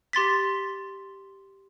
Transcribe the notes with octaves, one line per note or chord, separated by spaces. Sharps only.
G4 C6 A6 B6